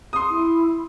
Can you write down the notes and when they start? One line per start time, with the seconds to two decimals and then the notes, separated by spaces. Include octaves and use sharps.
0.13 C6 D#6
0.30 E4